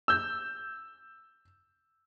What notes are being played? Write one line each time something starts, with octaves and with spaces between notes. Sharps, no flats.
E6 G6